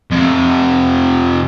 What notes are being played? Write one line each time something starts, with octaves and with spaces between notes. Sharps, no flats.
F2 C3